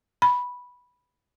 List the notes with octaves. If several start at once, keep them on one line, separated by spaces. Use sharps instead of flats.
B5